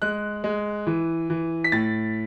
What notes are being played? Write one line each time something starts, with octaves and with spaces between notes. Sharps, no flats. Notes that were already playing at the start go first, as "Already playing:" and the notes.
G#3 F#6
G#3
E3
E3
B6
A2 A6